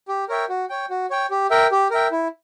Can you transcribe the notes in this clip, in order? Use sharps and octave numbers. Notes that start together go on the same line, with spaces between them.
G4
A#4 C#5 E5 G5
F#4
C#5 G5
F#4
C#5 G5
G4
A#4 E5 G5
G4
A#4 E5 G5
E4